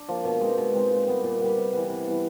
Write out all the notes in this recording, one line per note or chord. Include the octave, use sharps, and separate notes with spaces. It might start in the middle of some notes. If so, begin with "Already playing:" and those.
Already playing: D4
F3 A#3
B2
G#3 C4 D#4
B2
G#3 C4 D#4
A#2
G3 B3
A#2
G3 B3
C3
E3 G3 B3
C3
E3 G3 B3